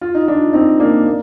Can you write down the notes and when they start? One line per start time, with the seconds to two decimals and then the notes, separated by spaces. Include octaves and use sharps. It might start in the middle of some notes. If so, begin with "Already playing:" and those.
0.01 F4
0.15 D#4
0.28 D4 F4
0.53 C4 D#4
0.80 A#3 D4
1.07 A#3